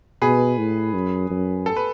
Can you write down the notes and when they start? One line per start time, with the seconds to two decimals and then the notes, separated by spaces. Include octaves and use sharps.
0.22 B2 G#4 B4
0.58 A2
0.94 F#2
1.30 F#2
1.66 A4
1.76 B4